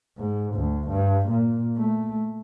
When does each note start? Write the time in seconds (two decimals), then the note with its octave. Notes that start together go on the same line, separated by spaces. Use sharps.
0.17 G#2
0.55 D2
0.89 G2
1.29 A#2
1.76 A3